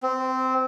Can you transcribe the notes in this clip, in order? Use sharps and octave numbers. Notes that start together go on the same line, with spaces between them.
C4